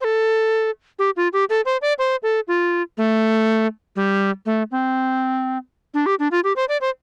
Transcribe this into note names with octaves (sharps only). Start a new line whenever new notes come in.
C5
A4
G4
F4
G4
A4
C5
D5
C5
A4
F4
A3
G3
A3
C4
D4
G4
D4
F4
G4
C5
D5
C5